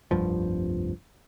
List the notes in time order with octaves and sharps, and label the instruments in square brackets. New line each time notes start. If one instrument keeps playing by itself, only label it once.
[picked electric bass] F1 C2 G2 F3